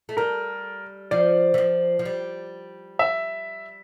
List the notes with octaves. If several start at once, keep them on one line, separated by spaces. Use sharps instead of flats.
A3
G3 A#4
F3 D5
E3
F3
F3
G3
E5